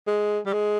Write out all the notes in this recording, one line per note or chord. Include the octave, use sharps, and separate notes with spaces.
G#3
G3
G#3